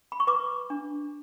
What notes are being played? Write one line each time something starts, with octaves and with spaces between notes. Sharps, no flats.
B5
C#6
B4 D6
D4